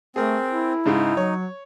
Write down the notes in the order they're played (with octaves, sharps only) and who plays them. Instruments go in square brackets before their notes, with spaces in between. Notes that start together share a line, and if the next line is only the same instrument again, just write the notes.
[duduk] A3 [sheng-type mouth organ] C4 [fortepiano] G#4 A#4
[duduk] E4
[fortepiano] G#2 C#3 G#3 [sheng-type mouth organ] D#4
[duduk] F#3 [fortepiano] C#5